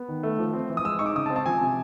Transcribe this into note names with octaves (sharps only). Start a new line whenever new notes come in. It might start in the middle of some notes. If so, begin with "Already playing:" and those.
Already playing: B3
D#3
A3
F3
C4
E3
D#6
G#3 E6
D#4 C#6
D6
C#3 D#6
A5
C4
A5
F3 G#5
C3